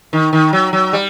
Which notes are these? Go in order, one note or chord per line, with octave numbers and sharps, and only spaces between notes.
D#3
D#3
F#3
F#3
G3